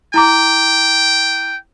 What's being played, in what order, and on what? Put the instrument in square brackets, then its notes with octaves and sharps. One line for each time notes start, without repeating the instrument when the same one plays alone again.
[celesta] E4 A#5 D6 [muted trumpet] G5